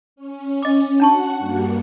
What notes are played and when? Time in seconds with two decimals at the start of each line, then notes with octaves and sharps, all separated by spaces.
0.16 C#4
0.63 D#5 D6
1.00 D4 F#4 F#5 A5 C#6
1.38 G2 G3 A#3